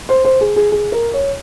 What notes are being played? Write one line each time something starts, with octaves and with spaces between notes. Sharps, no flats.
C5
C5
G#4
G#4
G#4
A#4
C#5